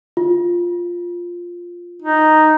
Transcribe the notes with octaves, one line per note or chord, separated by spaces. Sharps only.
F4
D#4